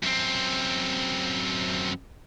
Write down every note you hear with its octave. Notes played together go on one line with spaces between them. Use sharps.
F#2 C4